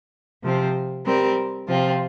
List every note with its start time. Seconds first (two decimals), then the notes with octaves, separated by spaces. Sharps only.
0.43 C3 F3 C4
1.05 G3 C4 G4 A#4
1.67 C3 F3 C4 F4